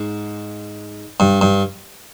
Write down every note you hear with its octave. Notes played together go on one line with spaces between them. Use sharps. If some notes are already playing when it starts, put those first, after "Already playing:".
Already playing: G#2
G2
G2